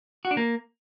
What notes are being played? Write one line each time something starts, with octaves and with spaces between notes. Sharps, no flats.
F#4
D4
A#3